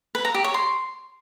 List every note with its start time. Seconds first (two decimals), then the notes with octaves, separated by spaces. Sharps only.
0.15 B4
0.25 A#5
0.35 G4
0.44 C#5
0.54 C6